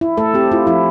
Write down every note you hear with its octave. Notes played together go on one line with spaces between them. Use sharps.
E4
A3 A4
C4 G4
E4 F4
F3 E4